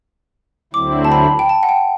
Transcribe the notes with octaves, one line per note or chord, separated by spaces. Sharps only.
D2 D3 F#3 C4 E4 D6
A5
B5
G5
A5
F#5
G5